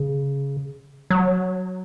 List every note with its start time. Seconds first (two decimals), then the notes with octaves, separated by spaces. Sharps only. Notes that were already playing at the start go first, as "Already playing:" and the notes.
Already playing: C#3
1.10 F#3